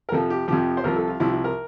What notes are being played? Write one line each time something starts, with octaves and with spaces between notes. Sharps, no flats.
A#4
F2 C3 F3 A4
G4
F2 C3 F3 G4
C5
C2 C3 F3 A#4
A4
F4
C2 C3 F3 E4
E4
A#4